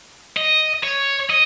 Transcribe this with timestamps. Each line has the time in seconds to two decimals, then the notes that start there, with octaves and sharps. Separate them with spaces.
0.37 D#5
0.83 C#5
1.30 D#5